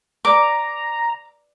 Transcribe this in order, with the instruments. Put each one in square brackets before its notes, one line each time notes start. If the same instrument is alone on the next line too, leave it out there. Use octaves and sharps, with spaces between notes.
[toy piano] B4 D5 [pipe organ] A#5 [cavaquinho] D6